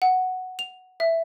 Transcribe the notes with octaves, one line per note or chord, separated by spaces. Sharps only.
F#5
F7
E5